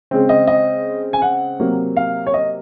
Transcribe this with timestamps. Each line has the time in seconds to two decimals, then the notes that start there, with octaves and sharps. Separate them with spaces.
0.11 C#3 G#3 C4
0.29 D#5
0.47 D#5
1.13 G#5
1.22 F#5
1.59 C3 F#3 A#3
1.97 F5
2.27 C#5
2.34 D#5